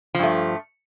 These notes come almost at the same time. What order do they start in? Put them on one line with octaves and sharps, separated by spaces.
F3 G2 A3